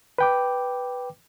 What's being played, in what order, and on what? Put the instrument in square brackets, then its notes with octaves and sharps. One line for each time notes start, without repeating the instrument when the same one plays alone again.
[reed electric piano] B4 G5 D6